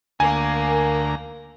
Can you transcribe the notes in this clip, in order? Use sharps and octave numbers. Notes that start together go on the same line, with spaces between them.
D2 A#3 G#5 A#5